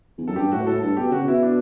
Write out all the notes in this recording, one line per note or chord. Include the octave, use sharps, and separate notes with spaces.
E2
F#2 A4
G2 G4
A2 F#4
A2 A4
G2 A4
B2 G4
C#3 F#4
B2 E4
D4